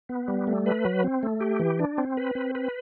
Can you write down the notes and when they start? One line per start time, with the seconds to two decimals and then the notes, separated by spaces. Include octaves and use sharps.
0.09 B3
0.28 G3
0.47 A3
0.66 B4
0.85 F#3
1.04 C4
1.23 A3
1.41 G4
1.59 E3
1.79 D4
1.98 C4
2.17 B4
2.35 C4
2.55 B4